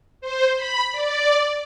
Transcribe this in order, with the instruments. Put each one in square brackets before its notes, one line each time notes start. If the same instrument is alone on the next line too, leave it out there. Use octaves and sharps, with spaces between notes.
[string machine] C5
B5
D5